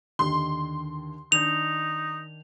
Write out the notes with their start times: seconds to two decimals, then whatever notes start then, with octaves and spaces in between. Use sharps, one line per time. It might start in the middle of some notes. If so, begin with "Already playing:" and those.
0.19 D#2 D3 D#3 C6
1.32 D#3 D4 D#4 G6 F7